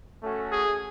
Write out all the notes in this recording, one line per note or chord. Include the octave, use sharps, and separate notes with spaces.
A3 C#4 F#4 A4
G#4